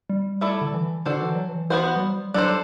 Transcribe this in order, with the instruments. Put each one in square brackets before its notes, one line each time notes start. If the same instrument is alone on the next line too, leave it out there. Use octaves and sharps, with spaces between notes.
[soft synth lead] G3
[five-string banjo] A3 E4 A4 D5
[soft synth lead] D3
E3
[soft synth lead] D3 [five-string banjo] D4 F#4 A4 C5
[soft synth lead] E3
F#3
E3
[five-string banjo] B3 F#4 C5
[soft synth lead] F#3
G3
[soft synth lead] F#3 [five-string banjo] D4 A4 C5